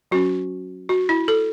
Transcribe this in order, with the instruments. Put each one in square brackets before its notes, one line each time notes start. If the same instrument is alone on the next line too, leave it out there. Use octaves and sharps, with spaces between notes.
[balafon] F#3 C#4 F#4
F#4
E4
A4